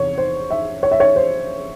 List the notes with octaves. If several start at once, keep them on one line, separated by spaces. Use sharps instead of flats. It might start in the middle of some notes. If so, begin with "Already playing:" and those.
Already playing: E2 C3 C#5
C5
E5
C#5
E5
C#5
C5